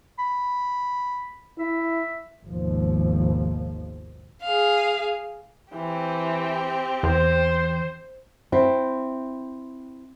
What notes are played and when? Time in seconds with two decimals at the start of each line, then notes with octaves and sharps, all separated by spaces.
0.19 B5
1.59 E4 E5
2.48 G#1 D#2 B2 F3
4.43 G#4 F5
5.74 E3 C4 G4
7.03 E2 C5
8.52 C4 E4